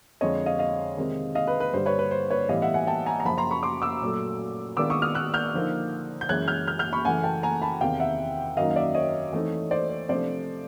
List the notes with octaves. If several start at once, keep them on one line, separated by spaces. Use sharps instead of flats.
F2 D3 F3 G#3 C#5 D#5
D#5 F5
D#5 F5
C3 D#3 G#3
D#5 F5
B4
B4
G2 D3 G3 C5
B4 C#5
B4
C5
B4 C#5
A2 E3 G3 B3 D#5 F5
E5 F#5
F#5 G#5
G5 A5
G#5 A#5
A#5
F#2 C#3 F3 A5 B5
A#5 C6
B5 C#6
C6 D6
D6 E6
A#2 F#3 A3
D#3 G#3 B3 D4 F4 D6 E6
C#6 D#6
D#6 F6
E6 F#6
F6 G6
D3 F3 A#3 D#4
G6
F#2 C#3 E3 G#3 C#4 F#6 G#6
F6 G6
F6 G6
F6 G6
B5 C#6
F#2 C#3 E3 A3 F#5 G#5
G5 A5
G#5 A#5
A5 B5
E2 C3 D#3 F5 G5
E5 F#5
F#2 D#3 F#3 A#3 D#4 D#5 F5
F5
D5 E5
C#5 D#5
E3 A3 C4 D#4
C5 D5
C5
C3 F3 A3 D4 C5 D5